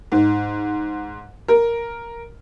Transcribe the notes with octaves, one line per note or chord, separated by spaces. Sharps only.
G#2
A#4